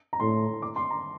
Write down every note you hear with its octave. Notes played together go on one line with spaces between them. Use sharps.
A#5
A2 C6
D6
C6
A#5